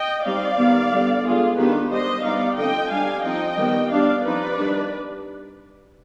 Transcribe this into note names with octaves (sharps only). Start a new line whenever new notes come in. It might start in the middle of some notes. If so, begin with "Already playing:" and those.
Already playing: D#5 G5
G3 C4 D#4 D5 F5
D#3 G3 B3
D3 G3 B3
D3 G#3 B3 F4 G#4
D#3 B3 D4 G4 B4
G3 D4 C5 D#5
G3 B3 D#4 D5 F5
D3 F3 C4 D#5 G5
G3 D4 F5 G#5
F3 C4 D#4 D#5 G5
D#3 G3 B3
G3 B3 D4 D5 F5
F3 C4 D#4 B4 D5
D#3 G3 D4